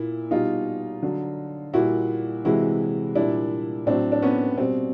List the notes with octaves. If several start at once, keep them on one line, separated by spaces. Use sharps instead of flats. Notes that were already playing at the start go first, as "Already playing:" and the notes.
Already playing: A#2 E4
B2 G3 D#4 F4
D3 F#3
A#2 G3 E4 F#4
C3 E3 G#3 E4 F#4
A#2 G3 D4 E4
A2 F#3 C4 D4
D4
B3 C#4
B2 G3 C4